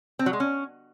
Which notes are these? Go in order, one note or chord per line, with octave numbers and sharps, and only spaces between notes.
C4
F#3
G#3
C#4